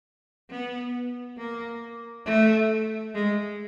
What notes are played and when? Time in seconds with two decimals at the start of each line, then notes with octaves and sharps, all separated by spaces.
0.50 B3
1.38 A#3
2.26 A3
3.15 G#3